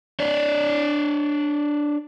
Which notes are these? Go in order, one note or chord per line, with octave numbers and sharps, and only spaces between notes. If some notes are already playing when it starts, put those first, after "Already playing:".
D4 C#5 D5